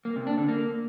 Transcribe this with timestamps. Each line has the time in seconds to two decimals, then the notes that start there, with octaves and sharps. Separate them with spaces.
0.05 A#3
0.16 C3
0.27 D4
0.38 D3
0.48 A#3